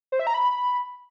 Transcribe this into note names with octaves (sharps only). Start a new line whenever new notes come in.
C5
E5
A#5
B5